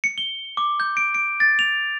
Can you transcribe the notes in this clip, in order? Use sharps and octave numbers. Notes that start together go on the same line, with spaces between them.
C#7
G7
D6
G6
D7
D7
A6
F7